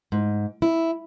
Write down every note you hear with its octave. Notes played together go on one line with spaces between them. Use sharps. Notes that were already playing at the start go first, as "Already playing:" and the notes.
G#2
E4